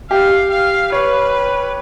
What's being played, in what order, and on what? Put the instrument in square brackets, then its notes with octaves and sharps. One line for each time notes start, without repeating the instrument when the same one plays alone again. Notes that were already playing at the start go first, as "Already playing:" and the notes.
[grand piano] G4 [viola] F5
[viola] F5
[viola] B4 [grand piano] C#5